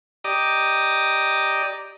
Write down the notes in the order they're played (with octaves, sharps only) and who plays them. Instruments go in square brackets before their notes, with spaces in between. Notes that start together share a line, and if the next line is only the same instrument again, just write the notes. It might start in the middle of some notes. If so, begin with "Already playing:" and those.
[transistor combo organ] G4 D5 D#5 A#5 D6 D#6